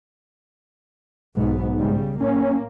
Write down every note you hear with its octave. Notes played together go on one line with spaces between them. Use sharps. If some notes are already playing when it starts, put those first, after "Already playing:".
B1 G#2 B3
C#3 G3
A2 A#3 C#4